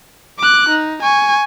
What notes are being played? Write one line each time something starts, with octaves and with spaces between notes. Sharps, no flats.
D6 F#6
D#4
G#5 C#6